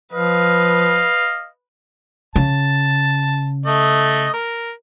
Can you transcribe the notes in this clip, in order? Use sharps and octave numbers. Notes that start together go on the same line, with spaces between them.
F3 B4 D#5 F5
C#3 A5
A3 D#5
A#4